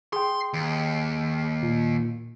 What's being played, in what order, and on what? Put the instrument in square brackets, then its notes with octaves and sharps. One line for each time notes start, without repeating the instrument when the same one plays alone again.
[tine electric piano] G#4 G5 [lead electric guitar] C6
[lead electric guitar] D#2
[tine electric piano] A#2